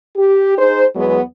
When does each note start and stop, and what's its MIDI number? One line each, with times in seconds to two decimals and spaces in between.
0.16 0.58 67
0.58 0.84 63
0.58 0.84 68
0.58 0.84 72
0.95 1.20 40
0.95 1.20 54
0.95 1.20 56
0.95 1.20 59